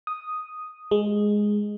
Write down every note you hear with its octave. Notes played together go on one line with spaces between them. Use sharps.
D#6
G#3